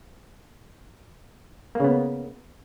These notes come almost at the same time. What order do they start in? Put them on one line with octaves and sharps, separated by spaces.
A#3 C#3 B3